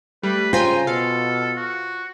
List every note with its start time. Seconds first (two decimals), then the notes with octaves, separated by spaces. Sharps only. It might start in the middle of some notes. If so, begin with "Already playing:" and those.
0.23 G3 A3 B4
0.53 C#3 F4 C5 G5 G#5 A#5
0.87 B2 A4 F5
1.56 F#4